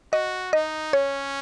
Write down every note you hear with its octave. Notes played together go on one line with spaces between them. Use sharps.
F#4 D#5
D#4 D#5
C#4 C#5